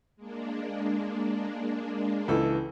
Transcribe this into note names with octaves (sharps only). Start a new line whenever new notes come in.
G#3 A#3 D4
C#2 E3 A4